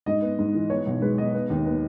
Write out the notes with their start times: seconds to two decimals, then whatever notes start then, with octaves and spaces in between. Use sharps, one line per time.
0.06 G#2 D#5
0.22 B3
0.39 G#2
0.55 E3
0.70 B3 C#5
0.86 B1
1.02 G#3 B4
1.18 B3 D#5
1.34 B3
1.50 D#2
1.65 B3